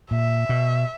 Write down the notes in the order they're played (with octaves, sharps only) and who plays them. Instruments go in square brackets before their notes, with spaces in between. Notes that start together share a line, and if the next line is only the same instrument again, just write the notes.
[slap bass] A#2 [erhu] E5
[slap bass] B2